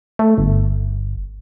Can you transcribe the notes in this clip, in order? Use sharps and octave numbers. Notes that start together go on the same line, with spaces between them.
A3
G1